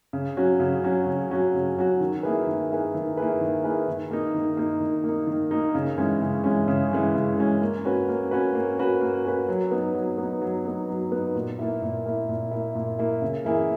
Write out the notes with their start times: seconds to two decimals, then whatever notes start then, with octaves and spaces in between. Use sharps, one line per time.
0.13 C#3
0.37 F#3 C#4 F#4
0.60 C#3
0.84 F#3 C#4 F#4
1.06 C#3
1.31 F#3 C#4 F#4
1.54 C#3
1.77 F#3 C#4 F#4
2.01 D#3
2.23 A#3 E4 G#4 B4
2.47 D#3
2.70 A#3 E4 G#4 B4
2.94 D#3
3.17 A#3 E4 G#4 B4
3.41 D#3
3.64 A#3 E4 G#4 B4
3.88 D#3
4.11 A#3 D#4
4.34 D#3
4.57 A#3 D#4
4.80 D#3
5.04 A#3 D#4
5.27 D#3
5.51 A#3 D#4
5.75 C#3
5.98 E3 G#3 C#4
6.22 C#3
6.44 E3 G#3 C#4
6.68 C#3
6.91 E3 G#3 C#4
7.15 C#3
7.38 E3 G#3 C#4
7.62 A#3
7.85 C#4 F#4 B4
8.09 A#3
8.31 C#4 F#4 B4
8.55 A#3
8.78 C#4 F#4 B4
9.01 A#3
9.25 C#4 F#4 B4
9.49 F#3
9.71 B3 D#4
9.95 F#3
10.18 B3
10.23 D#4
10.42 F#3
10.65 B3 D#4
10.89 F#3
11.12 B3 D#4
11.35 A#2
11.59 A#3 E4
11.82 A#2
12.06 A#3 E4
12.29 A#2
12.51 A#3 E4
12.75 A#2
12.99 A#3 E4
13.22 C#3
13.45 E3 A#3 E4 G#4